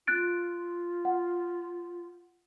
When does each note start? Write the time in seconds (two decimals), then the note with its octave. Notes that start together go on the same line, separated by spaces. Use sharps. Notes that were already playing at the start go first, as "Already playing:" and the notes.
0.07 F4 F#6 A6 D7
1.05 F#5